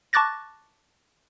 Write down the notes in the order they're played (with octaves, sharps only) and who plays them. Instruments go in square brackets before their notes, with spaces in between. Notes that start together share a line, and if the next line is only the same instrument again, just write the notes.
[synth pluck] A5 C#6 D6 F#6 A6 A#6